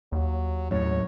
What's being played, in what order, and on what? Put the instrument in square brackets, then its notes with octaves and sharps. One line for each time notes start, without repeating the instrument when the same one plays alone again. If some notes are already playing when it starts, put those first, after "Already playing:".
[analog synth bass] D#2 [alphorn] F#3
[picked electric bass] F#2 A2 [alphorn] C#5